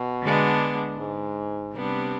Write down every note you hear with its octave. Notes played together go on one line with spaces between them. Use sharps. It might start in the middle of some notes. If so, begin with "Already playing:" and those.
Already playing: B2
D3 G#3 B3 D4
G#2
C3 G3 B3 D4